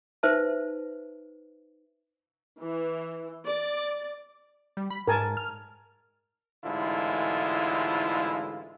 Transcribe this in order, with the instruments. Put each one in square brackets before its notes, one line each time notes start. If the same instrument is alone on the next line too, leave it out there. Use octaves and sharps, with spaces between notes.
[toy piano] D#4 B4 C5 E5 A5
[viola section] E3
D5
[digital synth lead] G3
B5
[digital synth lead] G#2 [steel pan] A#4 G#5 A5
[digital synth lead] F6
[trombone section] A1 G#2 D3 G#3 E4 F4